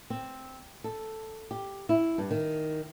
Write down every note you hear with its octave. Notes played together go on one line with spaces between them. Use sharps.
C4
A4
G4
E4
G2
D#3